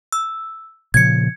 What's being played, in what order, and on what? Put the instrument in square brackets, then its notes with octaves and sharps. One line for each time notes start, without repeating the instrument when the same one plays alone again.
[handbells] E6
[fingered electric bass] A#2 C#3 F3 [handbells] G#6 C#7